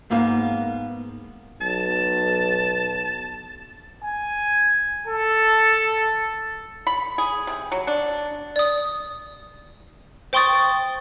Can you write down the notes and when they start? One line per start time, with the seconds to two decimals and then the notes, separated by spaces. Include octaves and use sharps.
0.11 G#2 A#3 B3 F5
1.61 B1 A5
4.04 G#5
5.07 A4
6.87 B5
7.18 G#4
7.47 C3
7.72 F#3
7.87 D4
8.56 D5 D#6
10.33 C5 G5 C6 C#6 D#6 A6